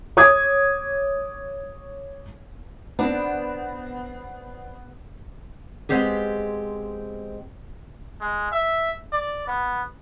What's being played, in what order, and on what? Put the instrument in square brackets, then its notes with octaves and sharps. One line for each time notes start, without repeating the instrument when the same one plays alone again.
[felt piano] C#5 D6 D#6 G#6
[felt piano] B3 [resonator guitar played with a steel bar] C4 D4
[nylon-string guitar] G#3 A3 B3 C4 G4 G#4
[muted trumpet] G#3
E5
D5
B3